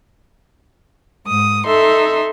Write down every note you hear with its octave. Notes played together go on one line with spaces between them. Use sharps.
G#2 D#6
D#4 A4 E5 C6